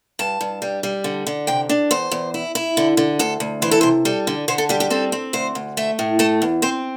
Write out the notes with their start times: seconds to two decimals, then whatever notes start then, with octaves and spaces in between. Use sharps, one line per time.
0.19 G2 A5
0.41 G2
0.62 G3
0.83 G3
1.04 D3
1.27 D3
1.47 C3 G5
1.69 D4
1.91 E2 C5
2.11 E2
2.34 E4
2.55 E4
2.77 D3
2.97 D3
3.19 D2 A4
3.40 D2
3.62 E3 C5
3.71 A4
3.81 C3 C5
4.05 G3 A4
4.27 D3
4.48 D3 C5
4.58 A4
4.69 G3 G4
4.80 G4
4.90 C4 A4
5.12 C4
5.33 D2 C5
5.55 D2
5.77 A3 E5
5.99 A2
6.19 A3 A5
6.42 E2
6.62 C4 C5